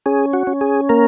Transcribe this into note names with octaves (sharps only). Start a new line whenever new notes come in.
C#4 G#4
F#4
C#4
G#4
A#3 A#4